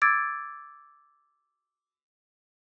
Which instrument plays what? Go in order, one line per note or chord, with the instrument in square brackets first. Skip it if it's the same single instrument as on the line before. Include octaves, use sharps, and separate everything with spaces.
[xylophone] D6 E6 G#6 A6 D7